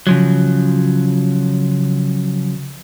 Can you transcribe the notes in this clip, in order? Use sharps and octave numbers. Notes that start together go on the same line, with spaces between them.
C#3 F3 F#3